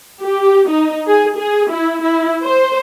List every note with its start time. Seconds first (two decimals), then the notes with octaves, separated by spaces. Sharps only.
0.21 G4
0.69 D#4
1.07 G#4
1.37 G#4
1.70 E4
2.03 E4
2.43 C5